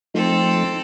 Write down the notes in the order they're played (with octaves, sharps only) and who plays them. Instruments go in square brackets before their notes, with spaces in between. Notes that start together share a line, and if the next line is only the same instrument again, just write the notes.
[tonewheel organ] F3 A3 D#4 [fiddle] C4 A4